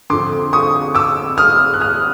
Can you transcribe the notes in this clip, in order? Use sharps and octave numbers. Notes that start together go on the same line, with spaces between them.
F2 D3 C6 D6
C#6 D#6
D6 E6
D#6 F6
F#6
D#6 F6